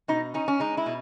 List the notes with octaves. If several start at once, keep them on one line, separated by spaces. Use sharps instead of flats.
B2 D#4
C#4 D#4
C#4
G#3 D#4
E4
B2